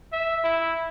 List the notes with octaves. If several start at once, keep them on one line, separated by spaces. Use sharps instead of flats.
E5
E4